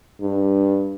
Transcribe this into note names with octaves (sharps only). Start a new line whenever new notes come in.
G2